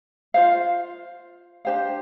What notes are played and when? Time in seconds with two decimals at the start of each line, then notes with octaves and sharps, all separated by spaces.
0.34 F4 C5 F5
1.65 D4 G4 C5 F5